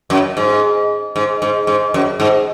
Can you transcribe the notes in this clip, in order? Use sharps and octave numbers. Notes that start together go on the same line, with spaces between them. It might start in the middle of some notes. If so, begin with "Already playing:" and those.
F#2
G#2
G#2
G#2
G#2
F#2
G#2